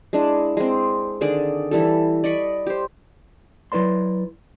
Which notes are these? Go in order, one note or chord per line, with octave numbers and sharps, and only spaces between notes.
G#3 D4 E4
G#3 C4
D3 D#3 G#4 D5
E3 G3 A4
D5 D#5 B5 C#6
G4 C5
F#3 E4 B4 D5 C6